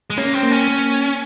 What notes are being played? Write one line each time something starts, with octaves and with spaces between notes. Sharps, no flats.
G#3
A#3 C#4
C4
A#3
C#4
A#3